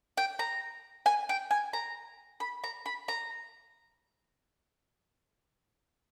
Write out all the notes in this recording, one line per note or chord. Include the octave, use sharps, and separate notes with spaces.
G5
A#5
G#5
G5
G#5
A#5
B5
A#5
B5
A#5